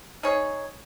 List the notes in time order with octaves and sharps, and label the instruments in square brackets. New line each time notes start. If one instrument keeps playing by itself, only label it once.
[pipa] D#4 G#4 C#5